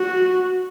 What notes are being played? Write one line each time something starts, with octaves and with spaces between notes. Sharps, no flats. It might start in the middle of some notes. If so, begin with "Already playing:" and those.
Already playing: F#4